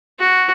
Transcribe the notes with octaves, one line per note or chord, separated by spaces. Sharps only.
F#4